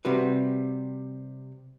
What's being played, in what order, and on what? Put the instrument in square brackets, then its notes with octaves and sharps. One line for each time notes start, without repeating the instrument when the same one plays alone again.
[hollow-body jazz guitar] C3 G3 F#4 B4